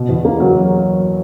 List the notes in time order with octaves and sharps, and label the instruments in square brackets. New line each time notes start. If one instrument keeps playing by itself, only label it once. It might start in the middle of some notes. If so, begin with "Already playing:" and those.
Already playing: [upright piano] B2
E2
A#3
F#3